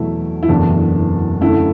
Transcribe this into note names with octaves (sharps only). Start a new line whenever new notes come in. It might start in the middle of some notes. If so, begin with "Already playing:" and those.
Already playing: E2 B2 F#3 A3 E4
E4
F#1 E2 B2 A3 D4
F#2 D3 A3 E4